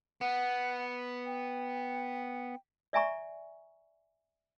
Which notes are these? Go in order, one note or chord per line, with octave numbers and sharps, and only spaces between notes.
B3 F#5
G5
D5 E5 G#5 A#5 C#6